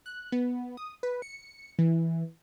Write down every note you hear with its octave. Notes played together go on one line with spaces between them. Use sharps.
F#6
B3
D#6
B4
C#7
E3